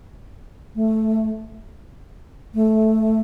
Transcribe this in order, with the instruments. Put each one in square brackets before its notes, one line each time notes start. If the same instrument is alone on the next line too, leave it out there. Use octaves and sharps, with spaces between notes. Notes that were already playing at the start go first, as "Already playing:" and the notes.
[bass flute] A3
A3